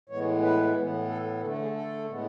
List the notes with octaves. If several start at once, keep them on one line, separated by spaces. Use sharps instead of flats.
A2 E3 G#3 B3 C#5
B4
A2 E3 B3
A4
D3 A3 A4
A4
G#4
A4
A2 G#3 B3